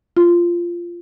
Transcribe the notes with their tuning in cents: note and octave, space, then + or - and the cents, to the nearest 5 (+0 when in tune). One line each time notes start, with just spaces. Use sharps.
F4 -10